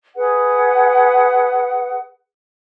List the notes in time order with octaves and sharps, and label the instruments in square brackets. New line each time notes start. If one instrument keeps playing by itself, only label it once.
[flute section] G#4 B4 F#5